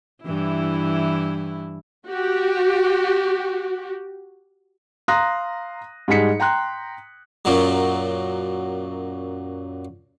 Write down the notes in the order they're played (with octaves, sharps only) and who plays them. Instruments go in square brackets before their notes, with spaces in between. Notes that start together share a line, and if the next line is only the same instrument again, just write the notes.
[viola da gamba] G2 E3 E4
[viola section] F#4 G4
[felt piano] F5 A#5 C6 D#6 F#6 A#6
G#2 G3 D#4 G#4 B6 C#7
G5 A#5 C6 F#6
[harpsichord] F#2 A#2 F#3